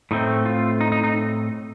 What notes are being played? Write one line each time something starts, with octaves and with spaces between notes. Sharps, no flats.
A2 A3 C4 D#4
F4
D#4
D#4
D#4